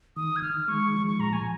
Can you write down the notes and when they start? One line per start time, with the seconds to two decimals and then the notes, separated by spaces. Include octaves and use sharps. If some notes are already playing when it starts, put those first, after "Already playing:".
0.16 D#3 D#6
0.36 G#6
0.42 D#3 F6
0.68 G#3 C#6
0.93 F3
1.06 C#6
1.19 A#2 A#5
1.33 G#5